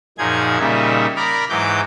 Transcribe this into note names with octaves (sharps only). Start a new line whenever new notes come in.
F#2 A#2 F3 D#4 G#4 G#6
A#2 C#3 G3 D#4 E5
A#4 D5 A#5 B5 F6
G#2 E3 F#3 D6 G6